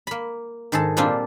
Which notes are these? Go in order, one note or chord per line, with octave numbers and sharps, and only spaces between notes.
A#3 B5
G#2 D#3 G#4 A4 A5
A#2 G3 A#3 C4 D4 F4